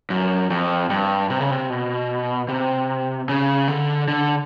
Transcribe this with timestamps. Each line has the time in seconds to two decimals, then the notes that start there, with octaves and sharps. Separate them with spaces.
0.10 F#2
0.50 F2
0.90 G2
1.30 C3
1.40 C#3
1.51 C3
1.70 B2
2.49 C3
3.29 C#3
3.68 D3
4.08 D3